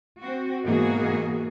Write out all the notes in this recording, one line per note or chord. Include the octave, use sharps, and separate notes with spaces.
C4 F#4
G#2 B2 E3 A#3 F#4 G#4